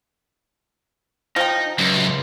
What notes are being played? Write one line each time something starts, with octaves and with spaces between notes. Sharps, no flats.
F3 D#4 G5
C#2 F#2